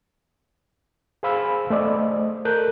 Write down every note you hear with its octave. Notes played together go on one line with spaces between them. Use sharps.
G#4 C5 F5 B5 E6
A3 C5 D5 D#5
A4 A#4 F#6 G6